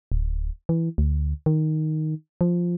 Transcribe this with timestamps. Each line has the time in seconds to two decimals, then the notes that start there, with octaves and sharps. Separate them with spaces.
0.12 D1
0.69 E3
0.98 D2
1.46 D#3
2.41 F3